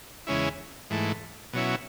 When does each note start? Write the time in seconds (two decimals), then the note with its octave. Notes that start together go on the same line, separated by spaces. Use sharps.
0.27 E2 C#3 G#3 C#4 E4
0.90 G#2 E3 A3
1.53 B2 F#3 C#4 E4